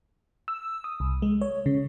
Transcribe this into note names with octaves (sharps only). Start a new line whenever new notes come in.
E6
D#6
C2
G#3
C#5
C#3